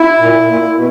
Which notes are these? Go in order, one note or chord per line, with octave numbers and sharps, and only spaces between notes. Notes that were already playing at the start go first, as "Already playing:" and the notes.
Already playing: E4
A#2
A#2
B2